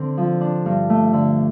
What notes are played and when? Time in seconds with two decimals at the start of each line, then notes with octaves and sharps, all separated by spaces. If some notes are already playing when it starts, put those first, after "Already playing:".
Already playing: D3 C4
0.17 F3
0.41 D4
0.66 G2
0.90 A3
1.13 D3